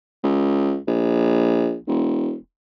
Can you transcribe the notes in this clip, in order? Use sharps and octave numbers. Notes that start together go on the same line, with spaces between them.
C#2
A#1
E1